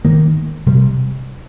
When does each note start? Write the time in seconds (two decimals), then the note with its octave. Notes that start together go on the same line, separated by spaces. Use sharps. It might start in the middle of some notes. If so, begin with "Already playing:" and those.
0.04 G#2 D#3 A#3
0.66 C3 G3